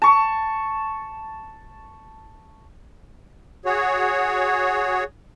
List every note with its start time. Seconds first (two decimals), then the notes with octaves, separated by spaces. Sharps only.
0.02 A5 C#6
3.65 F#4 G#4 C#5